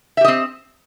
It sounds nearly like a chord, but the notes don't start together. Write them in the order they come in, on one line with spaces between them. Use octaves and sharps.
E5 G4 D#5 C4